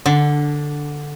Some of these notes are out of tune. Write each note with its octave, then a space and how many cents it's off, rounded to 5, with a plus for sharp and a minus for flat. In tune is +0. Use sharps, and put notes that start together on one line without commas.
D3 +5 D4 -10